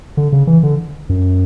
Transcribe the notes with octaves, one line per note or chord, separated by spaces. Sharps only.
D3
C#3
E3
D3
F#2